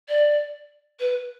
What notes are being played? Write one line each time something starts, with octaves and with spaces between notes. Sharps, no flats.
D5
B4